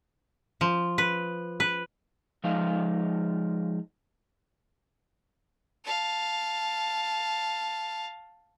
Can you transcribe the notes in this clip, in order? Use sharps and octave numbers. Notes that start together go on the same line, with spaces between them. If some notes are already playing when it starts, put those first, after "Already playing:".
F3
B4
B4
F3 G#3 D#4 C5 F5
F5 A5